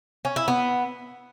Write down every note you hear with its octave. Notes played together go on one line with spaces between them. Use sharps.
C#4
E4
B3